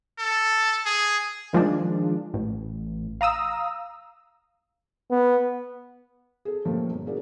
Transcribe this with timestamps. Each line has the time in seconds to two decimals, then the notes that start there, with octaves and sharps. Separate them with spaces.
0.19 A4
0.86 G#4
1.53 D#3 F3 G#3 D4
2.34 A1
3.21 F5 A#5 D#6 E6
5.11 B3
6.45 G#4 A4
6.65 A#2 F3 G3 A3 A#3 C#4
6.90 G1
7.06 C#4 E4 F#4 G#4 A#4 D5